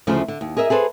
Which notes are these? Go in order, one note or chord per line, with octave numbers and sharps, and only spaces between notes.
D2 C#3 F3 A3
D3
D#2
G#4 A#4 D#5 E5
G#4 A4 B4 C5